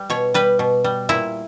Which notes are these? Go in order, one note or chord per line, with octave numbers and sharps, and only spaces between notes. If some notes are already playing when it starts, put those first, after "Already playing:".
Already playing: G3
B2 C#5
G3 B4
B2
G3
A#2 E4